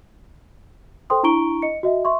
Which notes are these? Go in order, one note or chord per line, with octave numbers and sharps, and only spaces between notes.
A4 C5 G5 C6 D#6
D4 E4 A#5 C#6 D7 G7
D#5 C#7
F#4 D#5 E5
E5 C6 C#6